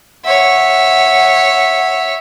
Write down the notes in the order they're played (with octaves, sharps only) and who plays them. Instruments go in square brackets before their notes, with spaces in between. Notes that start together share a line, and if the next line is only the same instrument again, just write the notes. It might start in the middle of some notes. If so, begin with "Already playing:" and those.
[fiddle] C#5 E5 [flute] F#5